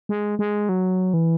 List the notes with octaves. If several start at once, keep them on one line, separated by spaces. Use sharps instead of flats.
G#3
G#3
F#3
E3